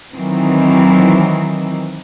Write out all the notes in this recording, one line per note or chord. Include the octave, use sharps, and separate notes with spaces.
D#3 E3 F#3 C4